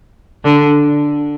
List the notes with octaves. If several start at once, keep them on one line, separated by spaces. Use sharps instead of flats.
D3